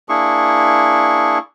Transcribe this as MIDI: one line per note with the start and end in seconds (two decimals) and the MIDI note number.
0.09 1.38 58
0.09 1.38 62
0.09 1.38 64
0.09 1.38 68
0.09 1.38 85